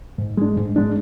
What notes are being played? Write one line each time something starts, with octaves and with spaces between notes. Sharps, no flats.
G#2
G#3 D4
G#2
G#3 D4